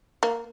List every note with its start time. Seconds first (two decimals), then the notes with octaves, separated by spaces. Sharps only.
0.23 A#3